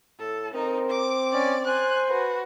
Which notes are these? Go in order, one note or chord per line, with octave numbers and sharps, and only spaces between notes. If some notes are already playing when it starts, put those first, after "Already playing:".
A2 A4
C4 D#4 A#4
D6
C#4 D5
C5 G#5 F#6
F#4 B4